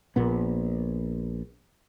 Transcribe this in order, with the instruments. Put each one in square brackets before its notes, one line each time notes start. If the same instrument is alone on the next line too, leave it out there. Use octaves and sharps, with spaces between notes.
[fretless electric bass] A#1 A#2 B3